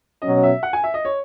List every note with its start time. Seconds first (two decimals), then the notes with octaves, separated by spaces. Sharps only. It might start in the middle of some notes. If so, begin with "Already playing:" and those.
0.22 B2 F#3 C#4 D#5
0.43 E5
0.63 F#5
0.73 G#5
0.84 E5
0.94 D#5
1.05 C#5